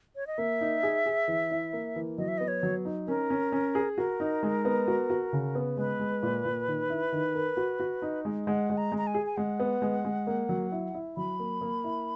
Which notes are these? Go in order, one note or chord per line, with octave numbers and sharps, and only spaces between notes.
C#5
D#5
A#3 E5
D#4
G#4
G#4
E3
E4
A#3
E3
F#3 D#5
E5
B3 D#5
C#5
F#3
D#4
C#4 A#4
C#4
C#4
G#4
F#4 A#4
D#4
G#3
B3
F#4
F#4
C#3
B3
G#3 B4
G#3
A#2
A#2
D#3
E4
D#3
A#4
F#4
F#4
D#4
G#3
G#3 F#5
G#3
A#5
G#3
A#5
G#5
G#4
G#5
G#3 F#5
B3
G#3
G#3
A#3
F#3
E4
E4
F#3 B5
A#3
A#3
E4